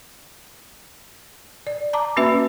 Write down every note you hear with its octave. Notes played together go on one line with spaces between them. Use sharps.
D5
A5 A#5 D6
A#3 C#4 F#4 B4 E5